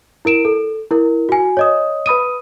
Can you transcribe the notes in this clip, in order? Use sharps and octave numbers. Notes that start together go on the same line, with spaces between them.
E4 A#4 D7 E7
A4
E4 A#4
F#4 G#5
C#5 D#5 D#6
B4 B5 D#6 D#7